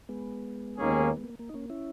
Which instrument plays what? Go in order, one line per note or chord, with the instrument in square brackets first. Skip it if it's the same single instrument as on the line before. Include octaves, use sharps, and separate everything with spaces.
[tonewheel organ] G#3 B3
[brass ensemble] D#2 D#3 A#3 C#4 G#4
[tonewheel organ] G#3
A#3
A#3
D#4
A#3 C#4
C#4 E4